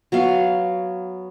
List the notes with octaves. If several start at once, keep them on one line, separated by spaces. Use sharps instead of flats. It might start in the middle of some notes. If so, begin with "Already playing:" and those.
F#3 B3 F5